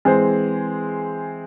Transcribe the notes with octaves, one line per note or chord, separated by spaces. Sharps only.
E3 G#3 C4 G#4 C5